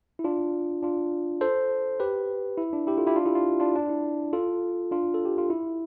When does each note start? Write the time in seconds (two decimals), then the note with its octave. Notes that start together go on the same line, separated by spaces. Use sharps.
0.19 E4
0.24 D4 F4
0.83 D4 F4
1.41 A4 C5
2.00 G4 B4
2.58 E4
2.73 D4
2.87 E4 G4
2.98 F4 A4
3.07 E4 G4
3.16 D4 F4
3.26 E4 G4
3.35 D4 F4
3.60 D4 F4
3.75 D4
3.90 E4
4.33 F4 A4
4.91 D4 F4
5.14 A4
5.25 G4
5.38 F4
5.50 E4